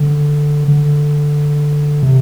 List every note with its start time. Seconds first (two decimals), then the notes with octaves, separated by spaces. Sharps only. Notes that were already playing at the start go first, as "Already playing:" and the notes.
Already playing: D3
0.68 D3
2.03 C3